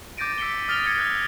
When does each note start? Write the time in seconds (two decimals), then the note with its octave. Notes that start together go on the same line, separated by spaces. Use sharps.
0.17 D6 G6 A6 A#6 D7 D#7
0.38 E6 B6 C#7 D7 G7
0.68 D#6 F6 A6 A#6 F7 G7
0.86 G#6 A6 C#7 D7
0.99 D6 E6 F#6